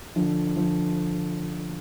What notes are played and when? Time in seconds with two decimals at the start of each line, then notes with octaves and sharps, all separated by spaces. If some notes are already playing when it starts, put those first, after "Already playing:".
0.16 D3 F3
0.56 D3 F3